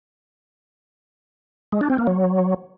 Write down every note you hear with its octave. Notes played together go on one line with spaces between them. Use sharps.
G#3
D4
C4
A#3
F#3